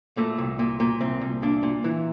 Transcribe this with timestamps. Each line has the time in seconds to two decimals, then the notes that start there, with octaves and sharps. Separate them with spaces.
0.17 A#2 A3
0.38 C2
0.59 A#2
0.80 A#2
1.01 C2 C4
1.21 C2
1.42 A#2 D4
1.63 A#2
1.84 E3